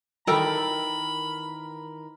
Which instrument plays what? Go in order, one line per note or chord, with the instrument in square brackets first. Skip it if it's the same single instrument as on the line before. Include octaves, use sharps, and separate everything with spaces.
[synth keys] D#3 E3 A#4 [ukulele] A4 G5 [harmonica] B5